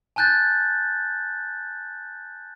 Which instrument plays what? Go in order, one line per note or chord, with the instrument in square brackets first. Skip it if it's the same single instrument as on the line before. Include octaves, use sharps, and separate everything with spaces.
[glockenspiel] G#5 A5 F#6 G6 A6